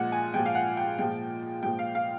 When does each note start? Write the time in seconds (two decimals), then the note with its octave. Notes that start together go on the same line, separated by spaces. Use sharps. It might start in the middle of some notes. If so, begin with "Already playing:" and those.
Already playing: A#2 F3 G#3 F#5
0.12 G#5
0.34 A#2 F3 G#3 G5
0.46 F5
0.55 F#5
0.77 G5
0.98 A#2 F3 G#3 G5
1.63 A#2 F3 G#3 G5
1.79 F5
1.95 F5